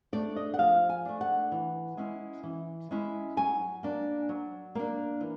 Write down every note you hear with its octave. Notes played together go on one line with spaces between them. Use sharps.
A3 D4 D5
D#5
F#5
F3 F5
G#5
A3 D4
F#5
E3
G#3 C#4 E4
E3
G#3 C#4 E4
F#3 G#5
A#3 D4
F#3
A#3 D4
E3